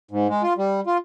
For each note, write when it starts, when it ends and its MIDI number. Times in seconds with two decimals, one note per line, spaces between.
0.11 0.27 44
0.29 0.42 56
0.43 0.53 65
0.58 0.80 55
0.87 0.97 65